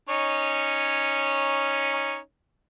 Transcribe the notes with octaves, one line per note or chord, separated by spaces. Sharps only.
C#4 D#4 C#5